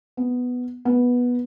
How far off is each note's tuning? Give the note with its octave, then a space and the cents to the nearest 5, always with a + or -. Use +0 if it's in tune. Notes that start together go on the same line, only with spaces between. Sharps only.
B3 +5
B3 -10